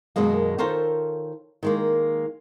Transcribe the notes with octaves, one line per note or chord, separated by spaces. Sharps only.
F#2 B2 D#3 G#3 A#3
D#3 F4 A4 A#4 C5 C#5
D#3 G#3 A#3